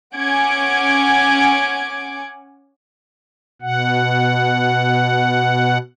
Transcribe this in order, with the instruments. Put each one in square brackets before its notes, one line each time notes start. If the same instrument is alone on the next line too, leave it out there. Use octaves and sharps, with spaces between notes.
[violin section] C#4 F#5 G#5 D6 G#6 D7
[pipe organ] B2 F#5